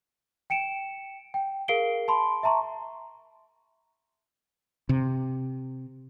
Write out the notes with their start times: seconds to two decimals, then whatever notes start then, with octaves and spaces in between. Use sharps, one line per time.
0.50 G5 C#7 D7 E7
1.34 G5
1.68 G#4 A#4 F5 C7 D7 G7
2.08 A5 B5 C6
2.43 E5 A5 A#5 C6 C#6
4.89 C3